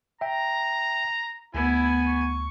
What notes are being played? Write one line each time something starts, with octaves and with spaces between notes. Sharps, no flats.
E5 G5 A#5
D2 B3 E4 G#5
C#6